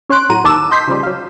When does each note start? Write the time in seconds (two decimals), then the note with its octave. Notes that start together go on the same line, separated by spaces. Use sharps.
0.09 C#4 C#5 C6 F#6 D7
0.29 A2 F#3 F#5 A#5 D#7
0.44 D#2 D#3 A5 D6 E6 E7
0.71 D#5 C6 G6 B6 C7
0.88 C#3 F3 G3
1.03 F#3 F5